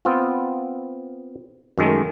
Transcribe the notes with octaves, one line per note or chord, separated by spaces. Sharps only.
B3 C4 F4
F#2 D#3 G#3 A3